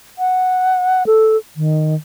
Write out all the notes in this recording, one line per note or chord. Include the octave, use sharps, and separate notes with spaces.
F#5
A4
D#3